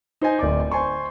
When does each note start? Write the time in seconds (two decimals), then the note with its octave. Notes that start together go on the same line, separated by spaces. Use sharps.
0.22 D#4 C5 D#5 G#5
0.39 D1 D5 D6
0.71 C5 G#5 C6 C#6